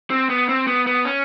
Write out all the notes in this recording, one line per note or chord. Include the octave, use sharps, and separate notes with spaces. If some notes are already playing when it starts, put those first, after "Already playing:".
C4
B3
C4
B3
B3
C#4